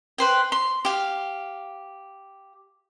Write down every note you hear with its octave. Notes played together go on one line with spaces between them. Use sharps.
B4 C5 G5
C6
G4 F5